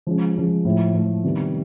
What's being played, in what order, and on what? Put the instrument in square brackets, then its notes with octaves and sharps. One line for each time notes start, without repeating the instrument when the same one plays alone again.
[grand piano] F3 G#3 C#4
F3 G#3 C#4
A2 F3 A3
A2 F3 A3
C3 D#3 G3 B3